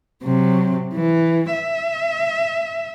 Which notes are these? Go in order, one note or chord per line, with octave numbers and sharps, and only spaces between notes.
C3 F#3
E3
E5